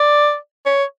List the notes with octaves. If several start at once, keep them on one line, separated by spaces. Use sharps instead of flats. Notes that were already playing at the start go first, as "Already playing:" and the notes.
Already playing: D5
C#5